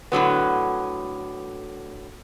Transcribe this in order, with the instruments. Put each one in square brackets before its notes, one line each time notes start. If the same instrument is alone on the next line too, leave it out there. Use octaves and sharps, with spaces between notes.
[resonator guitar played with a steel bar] A2 D3 F#3 B3